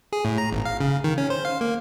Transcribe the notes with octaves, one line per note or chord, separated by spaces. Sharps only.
G#4
A2
A#5
G#1
F5
C#3
D#3
C#4
C5
F5
A#3